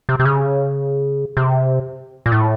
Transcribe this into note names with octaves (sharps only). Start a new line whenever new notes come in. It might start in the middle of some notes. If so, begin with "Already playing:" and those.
C3
C3
C#3
C3
A#2
A2